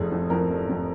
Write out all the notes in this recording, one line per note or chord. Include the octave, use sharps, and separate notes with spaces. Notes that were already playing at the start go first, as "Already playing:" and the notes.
Already playing: F1 F2 G#4
F2
F2 A#4
F1
F2